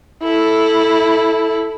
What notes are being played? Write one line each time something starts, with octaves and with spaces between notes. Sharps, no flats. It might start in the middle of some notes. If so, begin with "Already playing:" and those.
E4 A4